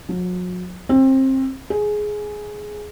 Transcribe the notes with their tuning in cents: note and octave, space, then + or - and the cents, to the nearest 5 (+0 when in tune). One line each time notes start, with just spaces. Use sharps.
F#3 -40
C4 +25
G#4 +10